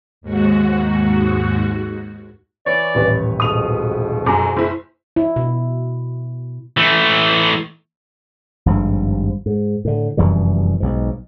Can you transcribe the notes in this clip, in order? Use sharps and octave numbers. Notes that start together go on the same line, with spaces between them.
D#2 G#2 F#4
E3 C#5 D5
D#1 A1 B4
F2 G#2 B2 D#6 F7
F#2 G#5 A#5 D6
F#1 E4
E4
B2
E3 A3
G#1 G2 F3
G#2
A2 D3
F1 F#2 E3 G3
B1 G#2